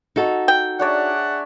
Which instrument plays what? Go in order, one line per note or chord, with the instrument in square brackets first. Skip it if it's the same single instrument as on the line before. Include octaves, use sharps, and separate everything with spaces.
[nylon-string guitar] D#4 F#4 A4
[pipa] G5
[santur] D4 C#5 D5 [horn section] G#4 E5 F#5